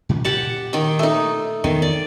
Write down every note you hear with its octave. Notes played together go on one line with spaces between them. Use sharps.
A#2 D#3 C#4
A#2 G4 F#5 A5
D#3 G5
A3 D#4
E2 D#3 B3
D5